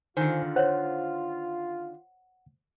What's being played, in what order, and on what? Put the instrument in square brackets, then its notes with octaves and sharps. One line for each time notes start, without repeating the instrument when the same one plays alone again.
[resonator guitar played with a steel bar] D3 D#3 [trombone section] F4 [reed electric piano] C5 G#5
[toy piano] C5 C#5 [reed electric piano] F#5